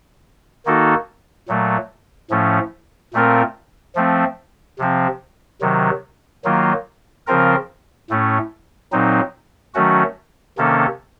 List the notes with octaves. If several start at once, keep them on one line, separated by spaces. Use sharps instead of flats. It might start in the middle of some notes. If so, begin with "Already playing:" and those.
D#3 A#3 D#4 F#4 A4
A#2 F#3 A3
A2 F3 A3 C#4
A#2 A3 C4 F4 A#4
F3 A3 C4
C3 F3 C4
C3 D#3 F#3
D#3 F#3 A#3 F4
C#3 F3 C4 F4 A#4
A2 A3 C#4
A#2 F#3 C4 D#4
D#3 F#3 A3 C#4 F#4
C3 D#3 A#3 C#4 A4